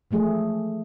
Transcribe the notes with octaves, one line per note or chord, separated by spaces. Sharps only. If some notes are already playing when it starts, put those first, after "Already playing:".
E3 F3 A3 G#4